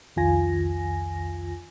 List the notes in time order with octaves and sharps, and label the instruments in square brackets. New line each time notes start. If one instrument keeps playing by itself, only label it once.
[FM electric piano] C2 F2 D#3 F4 G#5 A#6